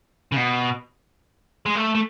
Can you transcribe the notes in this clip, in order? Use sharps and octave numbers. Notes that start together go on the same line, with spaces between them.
C#3
B2
G#3
A3
A3